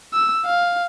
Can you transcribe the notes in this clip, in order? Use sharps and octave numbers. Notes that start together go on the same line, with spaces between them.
E6
F5